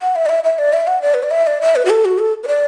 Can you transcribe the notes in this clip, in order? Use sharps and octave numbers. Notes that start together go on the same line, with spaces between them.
F#5
E5
D5
E5
E5
D5
E5
F#5
D5
B4
D5
E5
D5
E5
B4
F#4
A4
F#4
A4
B4
D5